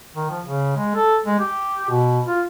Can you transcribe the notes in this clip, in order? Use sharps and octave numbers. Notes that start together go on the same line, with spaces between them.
D#3
F3
C#3
G#3
A4
G#3
G4
B2
F4